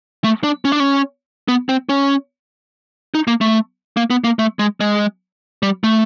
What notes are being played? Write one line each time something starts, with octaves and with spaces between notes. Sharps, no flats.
A3
D4
C#4
D4
C#4
B3
C4
C#4
D#4
A#3
A3
A#3
B3
A#3
A3
G#3
G#3
G3
A3